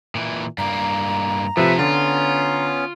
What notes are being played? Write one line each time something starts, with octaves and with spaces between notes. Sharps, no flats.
A#2 E3
G2 A#3 A#5
A2 C3 F3 A3 B4 E5
D3 B3 C#4 F4 A6